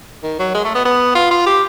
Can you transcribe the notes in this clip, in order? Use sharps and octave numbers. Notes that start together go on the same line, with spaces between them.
D#3
F#3
G#3
A3
B3
B3
F4
F4
G4